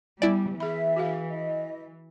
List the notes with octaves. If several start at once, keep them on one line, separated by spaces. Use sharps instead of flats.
G3 B3 E4 D5
E3 G#4 E5 B5
F#4 G#4 F5
D#5